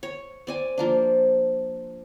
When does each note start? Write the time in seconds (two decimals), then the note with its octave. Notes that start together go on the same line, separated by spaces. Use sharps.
0.03 C#5
0.47 C4 D5 G#5
0.78 F3 A#3 D4